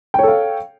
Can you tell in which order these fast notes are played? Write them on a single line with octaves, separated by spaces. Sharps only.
G5 C#5 A4 F5